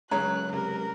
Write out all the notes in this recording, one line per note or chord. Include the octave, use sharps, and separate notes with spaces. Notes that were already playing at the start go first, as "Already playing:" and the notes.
C#2 F#2 C#3 C#5 A#5 F#6
C3 A#4